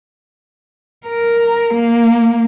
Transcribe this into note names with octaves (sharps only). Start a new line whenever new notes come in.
A#4
A#3